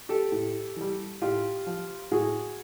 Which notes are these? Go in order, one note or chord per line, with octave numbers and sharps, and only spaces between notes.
G4 A4
A2
E3 G3
A2 F4 G4
F3
A2 F#4 G#4